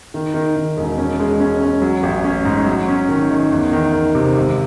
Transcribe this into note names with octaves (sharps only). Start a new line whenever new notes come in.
D#3
D#3
D#3
E1
C#4
G#3
C#4
C#4
F#3
A1
C#4
G#2
F#3
C#4
D#3
D#3
E2
D#3
D#3
C3
G#1